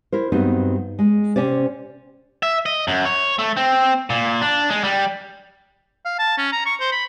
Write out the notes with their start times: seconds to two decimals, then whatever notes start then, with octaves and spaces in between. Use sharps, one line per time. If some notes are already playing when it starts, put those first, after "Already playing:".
0.12 E4 A#4 C5
0.32 G2 F#3 B3 C4 D#4
0.99 G#3
1.36 C3 C#4 C5 D5
2.43 E5
2.66 D#5
2.88 F#2
3.05 C#5
3.39 A3
3.57 C4
4.10 A#2
4.42 D4
4.70 G#3
4.84 G3
6.05 F5
6.19 A5
6.38 C#4
6.52 A#5
6.66 C#6
6.81 C5
6.92 B5